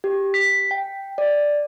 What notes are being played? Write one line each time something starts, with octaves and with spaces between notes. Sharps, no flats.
G4
B6
G5
D5